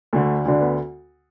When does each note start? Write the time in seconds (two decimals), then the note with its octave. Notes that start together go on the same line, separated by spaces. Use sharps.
0.13 D2 D3 A3
0.45 D2 D3 D4
0.60 B3